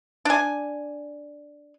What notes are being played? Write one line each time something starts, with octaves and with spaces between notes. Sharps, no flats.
D4 G#5